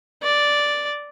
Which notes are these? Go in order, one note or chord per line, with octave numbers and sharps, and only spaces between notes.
D5